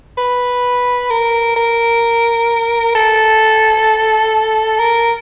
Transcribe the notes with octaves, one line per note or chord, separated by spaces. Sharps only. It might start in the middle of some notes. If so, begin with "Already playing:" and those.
B4
A#4
A#4
A4
A#4